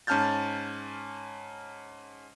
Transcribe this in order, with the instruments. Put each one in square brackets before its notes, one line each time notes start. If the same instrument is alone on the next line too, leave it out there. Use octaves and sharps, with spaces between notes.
[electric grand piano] G#2 C#4 A5 F6 G6 A6